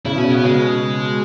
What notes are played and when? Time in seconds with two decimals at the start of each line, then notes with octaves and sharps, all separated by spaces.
0.05 C#3 E4
0.15 B2
0.18 C#4
0.24 C#3
0.31 B2 B3
0.44 C#3 G#3